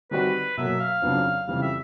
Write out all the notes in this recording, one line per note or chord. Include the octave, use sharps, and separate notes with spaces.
D#3 G3 C4 D#4 F#4 B4
B2 F#3 A#3 E5
F5
F2 C#3 F#3 B3 D4
F2 C#3 E3 G3 F5
E5